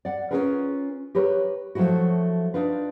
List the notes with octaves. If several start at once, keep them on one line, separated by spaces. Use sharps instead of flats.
D5 F#5
C#4 D#4 F4 G#4 A#4 B4
G4 A#4 B4 C#5
F3 F#3 A3 E4 F#4
D4 D#4 F4 B4